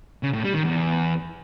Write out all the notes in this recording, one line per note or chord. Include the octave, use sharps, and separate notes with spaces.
C#3
A2
G3
D#3
E2